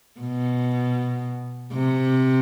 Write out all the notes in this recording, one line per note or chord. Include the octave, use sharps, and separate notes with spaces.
B2
C3